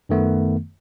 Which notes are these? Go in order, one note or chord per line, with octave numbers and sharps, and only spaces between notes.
F#2 D#3 A3 B3